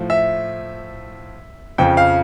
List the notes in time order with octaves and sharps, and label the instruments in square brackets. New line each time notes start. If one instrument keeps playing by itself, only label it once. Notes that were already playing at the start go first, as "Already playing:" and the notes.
Already playing: [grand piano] A2 F3
E5
F2 C#3 F3 G5
F5